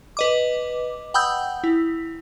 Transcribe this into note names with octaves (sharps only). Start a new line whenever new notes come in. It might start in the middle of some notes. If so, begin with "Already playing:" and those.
B4 D#5 D6
F#5 G5 B5 D#6 E6 G6
E4